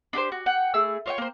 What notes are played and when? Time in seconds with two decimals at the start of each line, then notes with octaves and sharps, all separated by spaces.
0.13 D4 G4 B4 C5
0.32 F#4
0.46 F#5 G5
0.74 A3 E4 G#4 E6
1.06 F4 C#5 E5 G5
1.18 A#3 C5